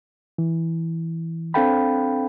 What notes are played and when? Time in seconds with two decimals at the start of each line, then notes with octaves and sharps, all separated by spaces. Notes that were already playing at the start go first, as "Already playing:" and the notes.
0.38 E3
1.54 C4 D4 A4 F5 G5 B5